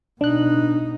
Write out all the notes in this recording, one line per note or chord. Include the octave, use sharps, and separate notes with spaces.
B2 D4 D#4 F#6